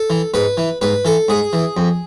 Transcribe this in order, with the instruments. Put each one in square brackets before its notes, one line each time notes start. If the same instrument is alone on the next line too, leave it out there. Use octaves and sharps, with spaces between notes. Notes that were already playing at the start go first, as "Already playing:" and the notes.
Already playing: [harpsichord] A4
E3
G#2 B4
E3
G#2 B4
E3 A4
G#2 G#4
E3
F2